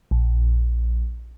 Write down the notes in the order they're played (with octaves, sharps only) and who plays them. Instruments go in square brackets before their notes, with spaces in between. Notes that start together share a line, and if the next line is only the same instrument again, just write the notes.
[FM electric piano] A#1